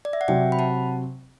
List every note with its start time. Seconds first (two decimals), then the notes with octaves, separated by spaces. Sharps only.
0.05 D5
0.13 E5
0.21 F#5
0.28 C3 F#3 C4 E5 G5
0.52 B5
0.59 F#5 A5